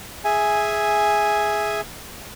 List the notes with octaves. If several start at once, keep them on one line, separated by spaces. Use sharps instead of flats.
G#4 E5 G#5